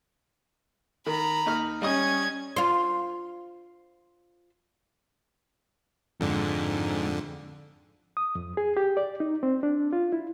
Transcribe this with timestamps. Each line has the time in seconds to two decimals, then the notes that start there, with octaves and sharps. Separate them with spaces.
1.07 D#3 A#5 B5
1.46 D#2 D#4 F6
1.82 G3 C#4 D#5 D#6 G#6
2.56 F4 C5
6.20 F2 G#2 D3 G#3
8.17 D#6
8.35 F2
8.57 G#4
8.77 G4
8.97 D5
9.20 D#4
9.43 C4
9.63 D4
9.93 F4
10.13 E4